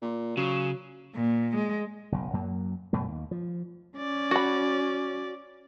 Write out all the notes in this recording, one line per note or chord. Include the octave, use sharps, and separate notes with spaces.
A#2
C#3 F#3
A#2
G#3
F#1 B1
F#2 F#3 A#3
F#1 F#2 B2 A3
D#2
F3
C#4 D5
F#4 B5